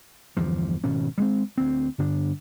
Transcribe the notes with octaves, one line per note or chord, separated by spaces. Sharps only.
G1 E2 F3
G#1 B2 C#4
G3 G#3 C4
D2 C4
G2 D3 D4